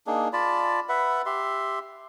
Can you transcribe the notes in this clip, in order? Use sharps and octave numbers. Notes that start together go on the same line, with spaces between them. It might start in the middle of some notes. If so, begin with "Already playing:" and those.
A#3 D4 D#4 G#4
F4 D5 A5 B5
B4 E5 F#5 B5
G4 E5 C6